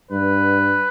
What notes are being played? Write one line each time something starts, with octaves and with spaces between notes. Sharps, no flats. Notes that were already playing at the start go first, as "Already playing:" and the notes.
G2 B4